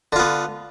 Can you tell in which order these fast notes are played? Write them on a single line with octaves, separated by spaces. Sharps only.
D3 F4 B3